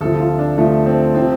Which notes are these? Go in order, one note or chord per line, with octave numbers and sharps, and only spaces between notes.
D2 C3 F3 A4
F4
D4
D2 C3 F3 A3
C4
C3 F3 C4